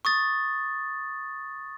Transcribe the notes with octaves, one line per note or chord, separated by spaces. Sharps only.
C#6 D#6 A6